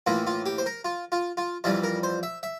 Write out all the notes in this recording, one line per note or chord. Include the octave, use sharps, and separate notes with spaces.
A2 E3 A#3 F4
F4
G4
C5
A#4
F4
F4
F4
F2 E3 G3 F4
A#4
C5
E5
E5